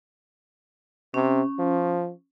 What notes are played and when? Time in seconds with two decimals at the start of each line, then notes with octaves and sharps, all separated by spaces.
1.14 C3 C#4
1.59 F3